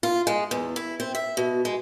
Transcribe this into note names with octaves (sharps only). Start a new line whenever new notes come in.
F4
G#3
E2
E4
C4
E5
B2
G#3